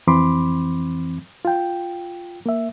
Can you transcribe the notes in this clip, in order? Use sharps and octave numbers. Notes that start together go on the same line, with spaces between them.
F2 E3 C4 B5 C6 D6
F4 G5
A#3 E5